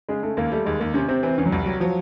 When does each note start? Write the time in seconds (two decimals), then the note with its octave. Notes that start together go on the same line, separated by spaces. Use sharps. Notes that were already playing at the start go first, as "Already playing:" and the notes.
0.09 C#3 G#3
0.23 C#3 A3
0.37 D#2 A#3
0.52 G3 A3
0.66 D#2 G#3
0.80 D#2 A#3
0.94 C3 C#4
1.09 C3 C4
1.23 E3 C4
1.38 E2 C#4
1.46 F#3
1.51 C2 G3
1.66 F#3
1.80 F3 F#3